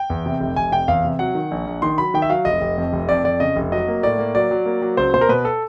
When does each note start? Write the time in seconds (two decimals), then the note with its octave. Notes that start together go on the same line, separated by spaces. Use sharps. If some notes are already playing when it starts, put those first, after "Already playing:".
Already playing: G5
0.10 E2
0.26 C3
0.40 F1
0.56 F1 G#5
0.72 C3 G5
0.88 E2 F5
1.05 C3
1.19 F#3 F#5
1.35 D#3
1.51 A#1
1.67 A#1
1.82 D#3 C6
1.98 F#3 B5
2.14 D#3 G5
2.22 E5
2.29 F#3 F5
2.45 F1 D#5
2.61 F1
2.78 F2
2.93 F1
3.09 F2 D5
3.24 F2 D5
3.40 C#3 D#5
3.56 F1
3.72 F#3 D#5
3.88 A#3
4.03 A2 D5
4.19 A#3
4.35 F#3 D5
4.51 F#3
4.65 A#3
4.82 F#3
4.97 C#2 C5
5.14 B2 C5
5.21 A#4
5.29 B2 B4
5.45 A4